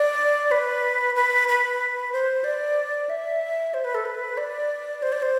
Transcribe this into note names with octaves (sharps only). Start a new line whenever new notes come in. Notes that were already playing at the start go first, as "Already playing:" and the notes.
Already playing: D5
B4
B4
B4
C5
D5
E5
C5
B4
A4
B4
D5
C5
D5
C5